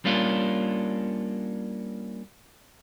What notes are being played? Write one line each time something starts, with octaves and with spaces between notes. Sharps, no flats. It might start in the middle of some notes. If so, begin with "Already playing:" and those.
G3 A#3 C#4 D4 F4